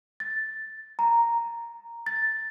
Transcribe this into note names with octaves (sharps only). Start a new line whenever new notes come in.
A6
A#5
A6